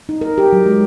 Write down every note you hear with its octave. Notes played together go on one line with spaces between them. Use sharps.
D#4
A#4
G4
F#3
G#3